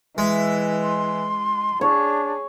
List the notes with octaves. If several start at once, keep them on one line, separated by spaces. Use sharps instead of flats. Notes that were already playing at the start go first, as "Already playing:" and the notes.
E3 G#3 E5
C6
D4 G#4 C#5